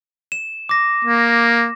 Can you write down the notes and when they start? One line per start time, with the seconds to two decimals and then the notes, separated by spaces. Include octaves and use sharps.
0.32 E7
0.69 D6 A#6
1.05 A#3